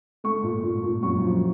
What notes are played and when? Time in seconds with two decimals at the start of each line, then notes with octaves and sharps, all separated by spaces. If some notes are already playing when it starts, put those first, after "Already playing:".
0.24 A3 C#6
0.44 A#2
0.63 A#2
0.83 A#2
1.03 F#2 C#6
1.23 F3